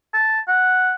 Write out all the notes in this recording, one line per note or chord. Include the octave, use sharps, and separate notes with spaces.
A5
F#5